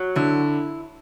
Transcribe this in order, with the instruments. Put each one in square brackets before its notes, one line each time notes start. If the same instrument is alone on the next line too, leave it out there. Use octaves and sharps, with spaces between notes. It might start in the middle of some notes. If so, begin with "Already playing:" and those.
Already playing: [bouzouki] F#3
[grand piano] D3 [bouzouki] E4